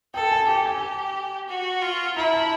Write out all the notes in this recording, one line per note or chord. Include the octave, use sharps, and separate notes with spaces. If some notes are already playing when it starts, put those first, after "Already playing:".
A4 G5
G#5
G4 G5
G#5
F#4
F4
E4 A#5
A5